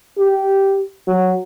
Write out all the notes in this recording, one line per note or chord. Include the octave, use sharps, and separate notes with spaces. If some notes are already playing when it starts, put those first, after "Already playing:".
G4
F#3